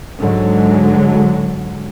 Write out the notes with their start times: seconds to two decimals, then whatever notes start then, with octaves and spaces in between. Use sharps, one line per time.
0.20 G#2 D3 F#3 G#3